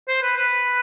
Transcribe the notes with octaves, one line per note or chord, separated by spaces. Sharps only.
C5
B4
B4